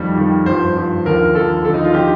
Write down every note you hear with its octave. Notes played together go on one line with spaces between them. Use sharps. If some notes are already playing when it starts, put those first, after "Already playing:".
Already playing: F2 D#3 G3
F2 D#3 G3
G2 F3 C5
G2 F3
D#2 D3 F3 A#4
D#2 D3 F3 A4
D#2 D3 F3 A4
D#4
F4
D3 F3 G4